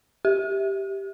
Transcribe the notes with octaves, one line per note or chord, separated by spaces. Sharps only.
G4